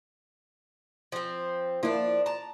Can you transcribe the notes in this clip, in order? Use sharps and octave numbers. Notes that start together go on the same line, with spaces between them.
F3 C4
F3 A#3 D4 E4 F4
A5 A#5